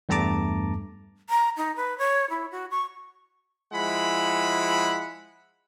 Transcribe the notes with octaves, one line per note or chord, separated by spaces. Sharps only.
E2 G2 A3 A5 A#5 D6
A#5
D#4
B4
C#5
E4
F#4
C#6
F3 G#3 E4 F#5 B5